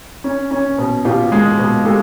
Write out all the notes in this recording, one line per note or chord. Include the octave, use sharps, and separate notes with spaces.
C#4
C#4
B2
B2 F4 G4
G#3
B2
G#3 G4 A4